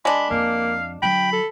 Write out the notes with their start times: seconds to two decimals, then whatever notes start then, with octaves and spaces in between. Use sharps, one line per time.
0.05 G#3 D4 B5
0.31 F2 A#3 F5
1.02 D3 F#3 G5 B5
1.32 A4